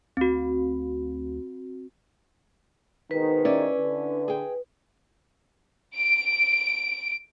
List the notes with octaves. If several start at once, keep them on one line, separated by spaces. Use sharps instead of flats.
D2 C4 F#4
G#2 B2 D#3 B4
C#4 E4 D5
D3
G#4 G5
D7